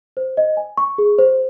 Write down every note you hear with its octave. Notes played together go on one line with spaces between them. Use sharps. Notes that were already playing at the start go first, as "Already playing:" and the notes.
C5
D#5
G#5
C#6
G#4
C5